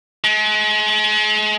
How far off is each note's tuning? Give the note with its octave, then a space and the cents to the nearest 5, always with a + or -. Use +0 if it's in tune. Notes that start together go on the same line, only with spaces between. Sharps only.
G#3 +35